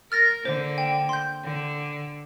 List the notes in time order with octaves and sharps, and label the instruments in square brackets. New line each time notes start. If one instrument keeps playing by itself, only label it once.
[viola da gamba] A#4 [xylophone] F6 A6 A#6
[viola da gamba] D3 A#3 [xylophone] C5
[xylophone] G5
C6 G6
[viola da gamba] D3